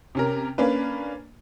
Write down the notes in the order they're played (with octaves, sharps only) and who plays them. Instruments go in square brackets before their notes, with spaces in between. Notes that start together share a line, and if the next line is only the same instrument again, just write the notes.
[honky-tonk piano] C3 C#4 A#4
A#3 C#4 D4 B4